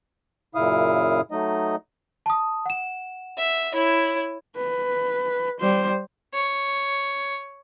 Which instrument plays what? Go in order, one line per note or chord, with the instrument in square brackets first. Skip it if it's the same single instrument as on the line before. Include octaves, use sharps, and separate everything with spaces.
[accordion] F#2 A#2 C#3 E4 F5 D#6
F#3 A3 D#4 D#5
[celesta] A5 D#6
F#5 E7
[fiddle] E5
E4 C#5
[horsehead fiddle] B4
G3 C5
[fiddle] C#5